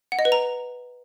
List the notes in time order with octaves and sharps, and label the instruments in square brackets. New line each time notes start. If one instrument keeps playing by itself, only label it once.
[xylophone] F#5
D#5
B4
A#5